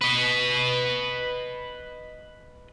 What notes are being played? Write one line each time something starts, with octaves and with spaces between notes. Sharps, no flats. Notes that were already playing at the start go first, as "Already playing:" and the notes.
B4 D#5